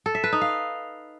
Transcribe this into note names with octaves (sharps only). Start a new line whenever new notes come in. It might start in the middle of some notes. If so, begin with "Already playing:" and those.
A4
E5
B4
D#4
F5